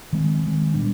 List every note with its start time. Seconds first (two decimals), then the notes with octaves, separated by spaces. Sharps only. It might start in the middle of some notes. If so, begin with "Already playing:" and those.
0.13 D#3 G#3 C4
0.43 D#3 G#3 C4
0.74 A#2 G3 B3 D4